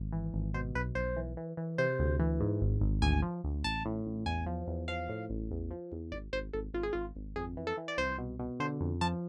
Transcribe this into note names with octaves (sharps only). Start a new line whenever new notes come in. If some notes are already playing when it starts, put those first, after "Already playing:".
Already playing: G#1
E3
G#1
B2 C5
B1 B4
B1 C5
E3
E3
E3
C3 C5
D2
E3
G#2
G#1
G#1
D2 G#5
F3
D2
A1 A5
A2
A1
E2 G#5
F3
E2
F3 F5
A2
A1
E2
F3
E2
G#1 D5
G#1 C5
G#1 A4
G#1 F4
G#4
G#1 F4
G#1
F2 G#4
E3
A4
E3
D5
C2 C5
B2
B2
D3 C5
F2
F3 A5